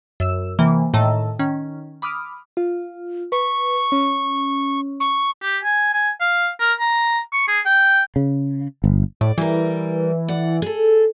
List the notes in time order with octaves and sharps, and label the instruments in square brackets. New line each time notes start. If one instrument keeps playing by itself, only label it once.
[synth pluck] F#2 E6 E7
C3 E3 A#3
A2 D#3 D#5 A5 A#5 E6
D#3 C#4
B5 D6 D#6 F6
[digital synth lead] F4
[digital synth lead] B4 [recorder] C#6
[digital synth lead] C#4
[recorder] C#6
[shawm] G4
G#5
G#5
F5
A#4
A#5
C#6
G#4
G5
[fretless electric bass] C#3
G1
[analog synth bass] A2 [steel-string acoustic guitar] D5
[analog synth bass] E3 [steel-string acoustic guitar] G3 A#4
[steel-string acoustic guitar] D5 F#5
G#4 A4